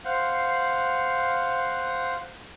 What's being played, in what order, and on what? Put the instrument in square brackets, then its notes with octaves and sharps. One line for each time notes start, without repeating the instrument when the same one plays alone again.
[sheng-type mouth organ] C5 F5 F#5